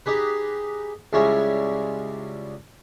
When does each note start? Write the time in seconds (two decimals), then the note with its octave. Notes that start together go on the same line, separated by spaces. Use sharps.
0.06 D#4 G4 G#4 B4
1.13 C#2 G3 G#3 E4 C#5 G#5